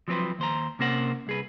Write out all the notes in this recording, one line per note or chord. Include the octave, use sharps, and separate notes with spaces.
F3 F#3 C4 G4 B4 C5
D#2 C5 A#5
C3 A#3 C#4 A#4 C5 F#5
C2 G#4 B4